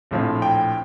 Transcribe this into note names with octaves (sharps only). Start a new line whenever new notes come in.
A#1 A2 F3 C4
G5